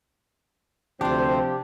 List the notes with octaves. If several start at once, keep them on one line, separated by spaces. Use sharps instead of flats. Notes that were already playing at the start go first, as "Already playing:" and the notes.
D2 C3 F3 C4 D4 G4 C5